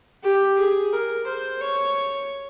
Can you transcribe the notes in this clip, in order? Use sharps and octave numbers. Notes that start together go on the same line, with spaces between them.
G4
G#4
A#4
C5
C#5